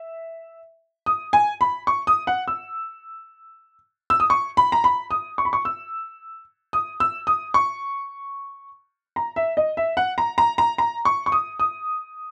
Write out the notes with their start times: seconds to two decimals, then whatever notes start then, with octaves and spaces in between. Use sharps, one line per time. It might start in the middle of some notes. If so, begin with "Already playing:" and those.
Already playing: E5
1.06 D#6
1.33 G#5
1.61 B5
1.87 C#6
2.07 D#6
2.27 F#5
2.48 E6
4.10 E6
4.20 D#6
4.30 C#6
4.57 B5
4.72 A#5
4.84 B5
5.11 D#6
5.38 C#6
5.45 B5
5.53 C#6
5.65 E6
6.73 D#6
7.00 E6
7.27 D#6
7.54 C#6
9.16 A#5
9.36 E5
9.57 D#5
9.77 E5
9.97 F#5
10.18 A#5
10.38 A#5
10.58 A#5
10.78 A#5
11.05 C#6
11.26 C#6
11.32 D#6
11.60 D#6